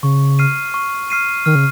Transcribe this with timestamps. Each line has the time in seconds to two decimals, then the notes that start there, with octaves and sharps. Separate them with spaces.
0.03 C#3 C#6
0.39 F6 C7 D#7
0.74 C#6
1.10 F6 C7 D#7
1.46 D#3 F6
1.55 C#3